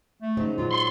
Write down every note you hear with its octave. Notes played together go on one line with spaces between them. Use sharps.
A3
G#2 C#3 F#3 D#4
A#2 F#3 F4
F4 C6